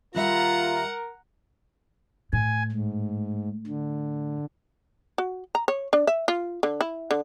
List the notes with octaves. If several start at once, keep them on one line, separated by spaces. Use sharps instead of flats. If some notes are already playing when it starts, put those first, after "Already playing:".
D#2 G3 F4 A#4 E5 F#5 A#5
A2 G#5
G#2
D3
F#4
A#5
C#5
D4
E5
F4
D3
E4
D3